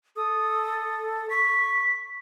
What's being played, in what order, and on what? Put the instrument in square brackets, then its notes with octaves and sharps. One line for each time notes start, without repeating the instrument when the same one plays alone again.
[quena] A4 [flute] D#6
[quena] C#6 [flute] B6